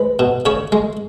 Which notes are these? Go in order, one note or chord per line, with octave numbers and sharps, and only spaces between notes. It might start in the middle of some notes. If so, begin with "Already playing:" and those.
Already playing: G#3 B4
B2
C#3 C#5
G#3